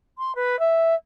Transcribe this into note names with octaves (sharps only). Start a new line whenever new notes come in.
C6
B4
E5